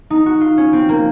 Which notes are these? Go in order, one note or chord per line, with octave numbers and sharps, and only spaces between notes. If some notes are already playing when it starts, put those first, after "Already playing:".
D#4
F#4
F4
C#4
C4
A#3